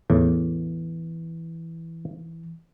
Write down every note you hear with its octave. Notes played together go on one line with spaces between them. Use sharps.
E2 A2 E3